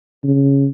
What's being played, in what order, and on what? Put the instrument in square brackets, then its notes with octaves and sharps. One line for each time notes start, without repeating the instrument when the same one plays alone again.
[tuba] C#3